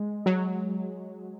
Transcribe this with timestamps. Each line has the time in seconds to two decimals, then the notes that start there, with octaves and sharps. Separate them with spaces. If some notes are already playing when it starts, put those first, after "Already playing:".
Already playing: G#3
0.26 F#3